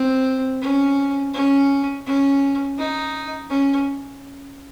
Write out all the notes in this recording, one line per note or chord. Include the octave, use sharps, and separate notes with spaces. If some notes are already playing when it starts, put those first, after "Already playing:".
Already playing: C4
C#4
C#4
C#4
D#4
C#4